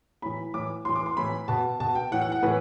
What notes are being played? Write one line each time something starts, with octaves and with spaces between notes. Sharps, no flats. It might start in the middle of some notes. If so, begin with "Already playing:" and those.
A2 E3 B5
A2 E3 D6
A2 E3 C6
D6
C6
A2 E3 B5
B2 A5
B2 A5
G5
A2 E3 F#5
F#5
F#5
A2 E3 B4